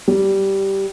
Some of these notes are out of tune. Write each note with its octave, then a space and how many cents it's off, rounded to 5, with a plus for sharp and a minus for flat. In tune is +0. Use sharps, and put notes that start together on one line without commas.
G3 -10